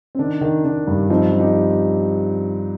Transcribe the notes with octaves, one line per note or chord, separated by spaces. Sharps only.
C4
D#3 D4
D#3
D#3 D4
G2
F3 C4 D#4
F3
D#4 G4